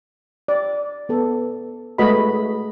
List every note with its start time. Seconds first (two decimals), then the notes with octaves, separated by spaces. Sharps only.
0.48 D5
1.09 B3 A4
1.98 G#3 A3 F#4 B4 D#5 B5